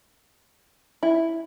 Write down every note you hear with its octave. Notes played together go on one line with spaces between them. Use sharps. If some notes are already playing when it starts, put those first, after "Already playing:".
E4